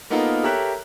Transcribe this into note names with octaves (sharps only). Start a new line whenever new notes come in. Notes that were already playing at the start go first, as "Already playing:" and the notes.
A#3 B3 D#4 F4 A4 A#4
G4 A4 A#4 C#5 E5 F#6